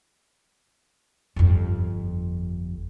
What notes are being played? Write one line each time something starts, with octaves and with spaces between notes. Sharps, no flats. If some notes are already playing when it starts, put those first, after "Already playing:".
G1 F2